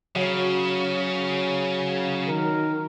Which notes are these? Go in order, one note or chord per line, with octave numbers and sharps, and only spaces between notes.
C#3 F#3
D#3 A#4